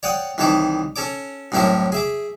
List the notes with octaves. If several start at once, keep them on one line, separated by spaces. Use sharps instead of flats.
C#5 D5 F#5 G5 D#6
C2 D#3 E3 C#5 A5 D6
C#4 A4 C#5 D6
C2 F#2 A2 C#4 A#4 E5
G#4 E5 D6